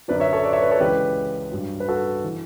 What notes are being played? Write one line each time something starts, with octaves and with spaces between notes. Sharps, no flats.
F#2 D3 F#3 B4 D5
C#5 E5
A4 C#5
B4 D5
C#5 E5
B4 D5
A4 C#5
C#2 C#3 E3 G4 B4
G2 F#3
B4
F#4 A4
E3